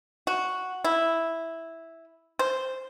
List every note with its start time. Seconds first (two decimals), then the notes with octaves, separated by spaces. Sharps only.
0.27 F#4
0.84 E4
2.39 C5